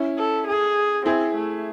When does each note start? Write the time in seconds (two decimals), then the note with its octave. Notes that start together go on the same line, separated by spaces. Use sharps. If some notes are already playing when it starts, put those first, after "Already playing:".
Already playing: C#4 E4
0.18 A4
0.47 G#4
1.06 C4 E4 G#4
1.35 A3